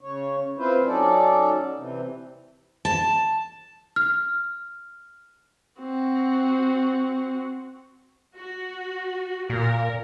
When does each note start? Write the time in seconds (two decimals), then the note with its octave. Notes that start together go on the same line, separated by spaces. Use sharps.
0.01 C#3 C#5
0.58 C4 E4 F4 B4 C5
0.86 F#3 C#4 D#4 A4 D5
1.76 C3 E3
2.85 A5
3.96 F6
5.80 C4 F#4
8.36 F#4
9.50 A#2 A#4